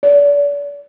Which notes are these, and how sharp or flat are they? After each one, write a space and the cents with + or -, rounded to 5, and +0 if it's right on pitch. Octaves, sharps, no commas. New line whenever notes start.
D5 -40